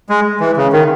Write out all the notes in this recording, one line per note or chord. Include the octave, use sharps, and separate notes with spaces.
G#3
E3
C#3
D#3